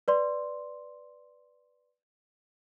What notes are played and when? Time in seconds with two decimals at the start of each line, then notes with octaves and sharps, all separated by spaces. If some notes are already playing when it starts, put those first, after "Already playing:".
0.08 B4 D5 C6